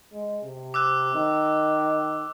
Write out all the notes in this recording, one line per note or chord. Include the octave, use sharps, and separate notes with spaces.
G#3
C3
D6 E6 F#6
D#3